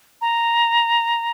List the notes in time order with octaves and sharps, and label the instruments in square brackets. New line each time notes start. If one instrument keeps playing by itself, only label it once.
[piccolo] A#5